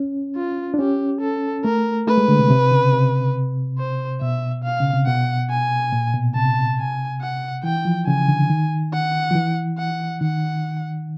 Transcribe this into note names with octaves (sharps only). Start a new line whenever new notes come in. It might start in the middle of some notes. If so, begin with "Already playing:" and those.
Already playing: C#4
F4
D4
C#4 G4
A4
A3 A#4
A3 B4
G#3
D3
C3
C3
C#3
C3
C5
B2 E5
F5
C#3
C3
B2 F#5
G#5
A#2
B2
C3 A5
G#5
F#5
E3 G5
F3
C#3 G#5
D3
D#3
F#5
F3
E3
F#5
D#3 F#5